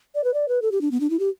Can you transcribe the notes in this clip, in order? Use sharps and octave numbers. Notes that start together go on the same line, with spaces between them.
D5
B4
D5
B4
A4
G4
D4
B3
D4
E4
G4